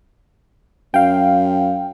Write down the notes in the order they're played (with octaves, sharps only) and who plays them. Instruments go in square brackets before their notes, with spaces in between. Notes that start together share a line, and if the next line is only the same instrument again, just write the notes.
[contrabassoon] F#2 [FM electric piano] F5 G5